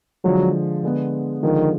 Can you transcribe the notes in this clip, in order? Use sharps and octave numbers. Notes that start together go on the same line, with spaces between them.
D3 F3 F#3 G#3
D3 G#3 B3
D3 D#3 F3 G#3